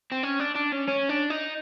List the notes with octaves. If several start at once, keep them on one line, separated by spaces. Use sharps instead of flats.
C4
C#4
D4
D4
C#4
C#4
D4
D#4